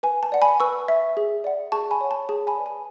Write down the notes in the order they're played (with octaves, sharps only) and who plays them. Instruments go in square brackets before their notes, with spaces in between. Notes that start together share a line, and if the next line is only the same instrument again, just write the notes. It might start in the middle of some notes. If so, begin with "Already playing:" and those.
[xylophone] B4 G#5
A5
D5 F#5
G#5 B5
B4 C#6 E6
E5
G#4
D5 F#5
G#4 A5 C#6
G#5 B5
C#5 F#5
A5
G#4 A5
G#5 B5
B4 D5
G#5